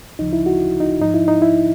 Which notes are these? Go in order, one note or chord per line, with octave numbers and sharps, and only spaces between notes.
D2 C#3 F3 D#4
E4
F#4
D#4
G#2 F3 D#4
E4
D#4
E4